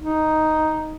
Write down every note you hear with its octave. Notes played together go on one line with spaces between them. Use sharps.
D#4